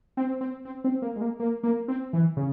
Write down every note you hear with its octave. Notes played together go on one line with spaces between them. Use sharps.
C4
C4
C4
C4
A#3
G#3
A#3
A#3
A#3
C4
E3
C#3